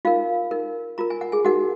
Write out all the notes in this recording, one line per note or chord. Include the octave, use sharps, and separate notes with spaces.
D#4 F4 A#4 F5
D#4 A#4
F4 A#4 A#5
G#5
F#5
G#4 G#5
D#4 F#4 A#4 F#5